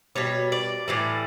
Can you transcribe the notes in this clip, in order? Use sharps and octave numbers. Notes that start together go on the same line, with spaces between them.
B2 G3 C#5
D5
A2 E3 G3